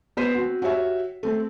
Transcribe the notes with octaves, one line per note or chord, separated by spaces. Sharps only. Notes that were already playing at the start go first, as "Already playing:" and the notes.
B3 C5 B6 D#7
C4 F#4
F#4 G4 C#5 E5
A3 C4